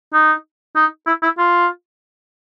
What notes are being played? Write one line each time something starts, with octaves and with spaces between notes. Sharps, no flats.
D#4
D#4
E4
E4
F4